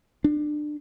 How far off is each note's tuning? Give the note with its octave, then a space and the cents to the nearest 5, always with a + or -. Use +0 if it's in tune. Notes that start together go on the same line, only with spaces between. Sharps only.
D4 +25